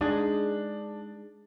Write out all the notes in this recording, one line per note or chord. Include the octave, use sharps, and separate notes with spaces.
G#3 D4 D#4 G#4